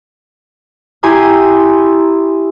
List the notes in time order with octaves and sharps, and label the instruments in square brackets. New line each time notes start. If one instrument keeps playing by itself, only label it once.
[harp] E4 G4 G#5 A#5 C6 D#6